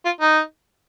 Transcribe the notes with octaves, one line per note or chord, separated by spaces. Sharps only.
F4
D#4